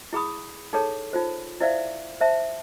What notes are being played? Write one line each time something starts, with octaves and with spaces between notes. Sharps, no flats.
E4 G#4 B5 D#6
D#4 G#4 A4 C#5 A5
D#4 F4 C5
E4 C5 D5 E5 F5
C5 E5 A5